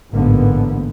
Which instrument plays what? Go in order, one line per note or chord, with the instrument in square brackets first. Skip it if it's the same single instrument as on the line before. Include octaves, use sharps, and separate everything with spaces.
[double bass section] A1 G#2 D3 A#3 B3